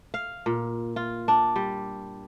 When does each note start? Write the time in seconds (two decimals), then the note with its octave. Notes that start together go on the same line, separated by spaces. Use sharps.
0.14 F5
0.46 A#2
0.96 F4
1.28 D4
1.56 G3